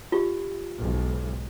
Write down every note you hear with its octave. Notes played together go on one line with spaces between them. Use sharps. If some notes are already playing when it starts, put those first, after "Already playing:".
F4 G4
B1 G#2